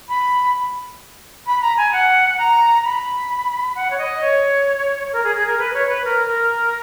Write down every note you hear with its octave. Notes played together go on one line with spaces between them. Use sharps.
B5
B5
A#5
G#5
F#5
A#5
B5
F#5
C#5
D#5
C#5
A#4
G#4
G#4
A#4
B4
C#5
B4
A#4
A#4